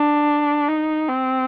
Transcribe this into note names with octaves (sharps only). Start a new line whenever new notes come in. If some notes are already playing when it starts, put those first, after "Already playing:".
Already playing: D4
D#4
C4